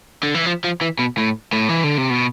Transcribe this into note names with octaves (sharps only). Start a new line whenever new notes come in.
D3
E3
F3
F3
E3
B2
A2
A2
E3
D3
C3
B2